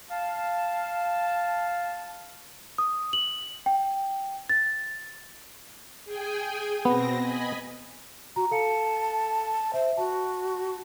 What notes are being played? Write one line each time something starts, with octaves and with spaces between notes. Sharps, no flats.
F5 A5
D#6
F#7
G5
A6
G#4 G5 G#5
B2 B3 C4 A#6
D#5 G#5 B5
F#4 A#5
A4 F5 A5 C#7
C5 E5
F#4 A5